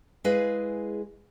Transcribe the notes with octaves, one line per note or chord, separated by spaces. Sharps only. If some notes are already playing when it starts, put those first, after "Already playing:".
G#3 E4 G#4 B4 D#5 F5